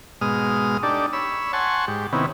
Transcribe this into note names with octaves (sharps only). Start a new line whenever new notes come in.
G#2 B2 G#3 D#6 F6
D4 D#4 G4 A4 D5
C#5 B5 E6
F#5 G#5 A5 C6 C#6
G#2 G4
C3 D#3 B3 C#4 E4